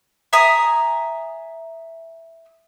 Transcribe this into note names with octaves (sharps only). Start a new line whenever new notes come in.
E5 G#5 A#5 D#6